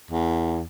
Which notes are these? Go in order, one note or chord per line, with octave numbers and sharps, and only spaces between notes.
E2